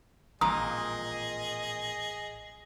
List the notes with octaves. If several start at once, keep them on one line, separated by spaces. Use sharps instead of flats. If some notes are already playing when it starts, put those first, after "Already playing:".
A1 F2 A#2 G#4 D#5 A#5 D#6